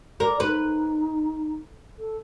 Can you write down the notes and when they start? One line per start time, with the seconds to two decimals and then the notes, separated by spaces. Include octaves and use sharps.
0.20 A#4 D5
0.40 D#4 B4
1.98 A4